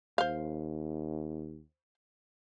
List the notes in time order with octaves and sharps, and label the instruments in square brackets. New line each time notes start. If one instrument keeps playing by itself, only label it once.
[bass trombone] D#2 [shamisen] C5 F5